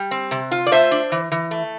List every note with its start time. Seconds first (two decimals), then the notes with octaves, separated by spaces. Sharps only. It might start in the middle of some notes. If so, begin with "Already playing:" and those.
Already playing: G3
0.11 C4
0.31 C3
0.51 F4
0.67 D5
0.71 A3 C5 E5
0.91 D4
1.12 E3
1.32 E3
1.51 A3